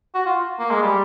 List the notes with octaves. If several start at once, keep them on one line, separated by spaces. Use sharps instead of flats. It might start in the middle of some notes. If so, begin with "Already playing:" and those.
F#4
F4
A#3
G#3
G3